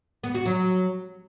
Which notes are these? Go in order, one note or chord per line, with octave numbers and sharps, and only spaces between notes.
B3
F#4
F#3